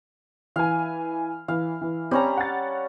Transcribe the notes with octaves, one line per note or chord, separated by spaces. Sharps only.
E3 F5 G#5
E3 F5
E3
G3 C4 C#4 A#5
F#5 A6